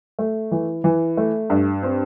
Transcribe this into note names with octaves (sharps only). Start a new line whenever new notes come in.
A3
E3
E3
A3
G2
C4